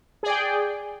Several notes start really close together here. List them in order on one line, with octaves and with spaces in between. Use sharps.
G#4 D5 G5